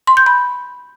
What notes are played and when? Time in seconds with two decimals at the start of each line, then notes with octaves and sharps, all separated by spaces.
0.07 C6
0.17 G6
0.26 B5